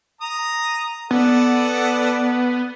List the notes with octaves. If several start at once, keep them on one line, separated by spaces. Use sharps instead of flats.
A#5 D#6
B3 A4 D5 F#5